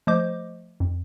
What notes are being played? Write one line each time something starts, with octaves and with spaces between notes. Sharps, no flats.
F3 A3 C5 D#5 D6 G6
F2